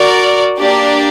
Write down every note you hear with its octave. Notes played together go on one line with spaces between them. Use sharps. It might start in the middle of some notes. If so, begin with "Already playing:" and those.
Already playing: F#4 A#4 D5
A#3 D4 G4 D5